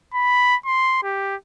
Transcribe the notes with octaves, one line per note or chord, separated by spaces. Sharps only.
B5
C6
G4